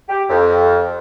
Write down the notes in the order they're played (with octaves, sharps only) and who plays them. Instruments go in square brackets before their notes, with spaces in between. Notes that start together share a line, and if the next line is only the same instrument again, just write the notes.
[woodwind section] G4
F2